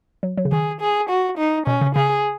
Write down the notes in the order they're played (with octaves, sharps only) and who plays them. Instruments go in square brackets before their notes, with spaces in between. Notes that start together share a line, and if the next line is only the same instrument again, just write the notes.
[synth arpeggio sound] F#3
F#3
C#3
[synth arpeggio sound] D#3 [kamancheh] G#4
[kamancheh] G#4
F#4
D#4
[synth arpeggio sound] B2 [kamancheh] C#4
[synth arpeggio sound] C#3
[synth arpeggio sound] C#3 [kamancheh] G#4